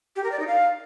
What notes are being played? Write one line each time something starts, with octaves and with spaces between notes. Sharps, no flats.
G4
A#4
D5
D#4
F5